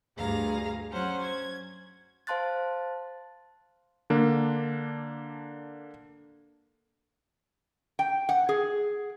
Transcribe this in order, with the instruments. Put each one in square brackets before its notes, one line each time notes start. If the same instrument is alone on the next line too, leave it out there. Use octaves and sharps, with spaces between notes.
[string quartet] D2 G2 G#4 F5 A#5
F#3 C#4 C5 F#5
G#6
[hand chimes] C5 F5 A5 C6 F#6 A6
[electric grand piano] D3 A#3 D4
[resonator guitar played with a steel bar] G5
F#5
G#4